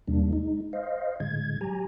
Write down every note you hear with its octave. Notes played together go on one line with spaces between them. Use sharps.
D#2 B2 G3 A#3 D4
G#3 D#4
C5 D#5 F5
A2 D3 G#3 G#6
F#3 G4 G#5 A#5